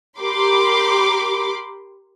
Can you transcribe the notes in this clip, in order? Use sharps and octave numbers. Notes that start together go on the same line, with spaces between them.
G4 A#4 B5 C6 D6